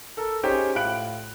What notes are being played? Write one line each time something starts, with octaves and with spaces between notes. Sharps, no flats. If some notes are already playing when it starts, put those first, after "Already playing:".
A4 A#4
C#4 D#4 G4 G#4 C5 C#5
A2 F4 B5 F#6 D7 F#7